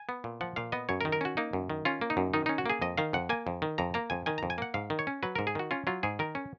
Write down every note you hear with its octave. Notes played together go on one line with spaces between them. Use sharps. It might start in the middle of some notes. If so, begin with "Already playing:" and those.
Already playing: G#5
B3
A#2
F3 F#5
A#2 F5
B3 D#5
F#2 C#5
A#4
D#3
A#4
C#4 F#4
A#3 D#4
F#2
D#3
C#4 F4
A#3
D#4
F#2
D#3 D#4
C#4 D#4
F#4
A#3 G#4
F2 D#5
D#3 F5
F2 F#5
A#3 G#5
F2
D#3
F2 A#5
A#3 A#5
F2 G#5
D#3 G#5
F2 A#5
G#5
A#3 F#5
G#2 F5
D#3
C#5
C#4
F#3 B4
G#2 A#4
G#4
D#3 F#4
C#4 F4
F#3 F4
G#2 G#4
D#3 A#4
C#4